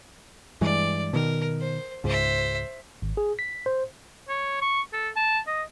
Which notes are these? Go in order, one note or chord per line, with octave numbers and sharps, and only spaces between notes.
G2 E3 G#3 D5
B2 D#3 A#4
C5
C#2 G#2 C5 E5
G#1
G#4
B6
C5
C#5
C#6
A4
A5
D#5